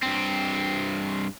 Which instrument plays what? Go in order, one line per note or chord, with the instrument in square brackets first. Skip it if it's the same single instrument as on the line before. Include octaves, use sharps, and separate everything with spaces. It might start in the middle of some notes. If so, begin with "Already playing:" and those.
[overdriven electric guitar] G2 C4